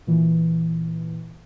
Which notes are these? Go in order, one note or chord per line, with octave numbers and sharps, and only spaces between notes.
A#2 E3